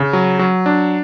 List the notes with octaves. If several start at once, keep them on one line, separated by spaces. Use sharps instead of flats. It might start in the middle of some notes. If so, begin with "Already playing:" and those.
Already playing: C#3
F#3
F#3
D4